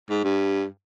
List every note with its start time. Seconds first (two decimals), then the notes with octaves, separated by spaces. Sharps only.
0.09 G#2
0.24 G2